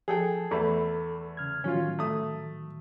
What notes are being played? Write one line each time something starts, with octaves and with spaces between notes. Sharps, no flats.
F3 G#4 A4 G5
E2 A3 A4 B5
C#3 F6 G#6
A2 D#3 F#3 C#4 F4
A3 D#6